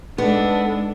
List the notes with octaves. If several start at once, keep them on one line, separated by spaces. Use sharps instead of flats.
G#2 B3 D4 A4